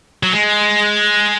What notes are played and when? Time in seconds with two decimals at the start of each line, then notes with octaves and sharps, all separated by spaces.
0.23 F#3
0.33 G#3